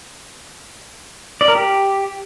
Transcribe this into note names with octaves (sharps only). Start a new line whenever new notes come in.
D5
A#4
G4